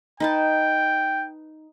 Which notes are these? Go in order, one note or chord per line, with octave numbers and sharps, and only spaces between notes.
D#4 B4 G5 A5